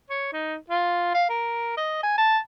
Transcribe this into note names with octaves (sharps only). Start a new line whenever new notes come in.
C#5
D#4
F4
F5
A#4
D#5
G#5
A5